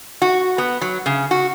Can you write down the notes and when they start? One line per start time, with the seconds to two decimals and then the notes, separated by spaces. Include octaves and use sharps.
0.22 F#4
0.58 B3
0.81 F#3
1.06 C#3
1.31 F#4